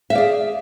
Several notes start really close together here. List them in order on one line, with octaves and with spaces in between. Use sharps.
E5 F5 D5 G#4